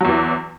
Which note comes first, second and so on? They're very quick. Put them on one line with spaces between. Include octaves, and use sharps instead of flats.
F#3 E2 E3